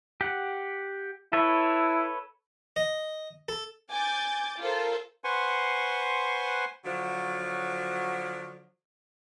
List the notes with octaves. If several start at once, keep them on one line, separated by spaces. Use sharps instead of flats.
G4 F#5
E4 A4 B4 C#5
D#5
A4
G#5 D6 G6 A6
F4 A4 A#4 C5
B4 C5 F#5 G#5 C6 C#6
D3 F3 F#3